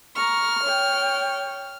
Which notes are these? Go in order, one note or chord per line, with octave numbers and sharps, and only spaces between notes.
A#5 C#6 F6
C#5 G5